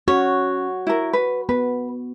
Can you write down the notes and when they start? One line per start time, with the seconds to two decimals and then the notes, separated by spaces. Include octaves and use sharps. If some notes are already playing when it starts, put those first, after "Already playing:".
0.08 C#4 F#4 C#5
0.87 E4 A#4
1.13 B4
1.49 B3 B4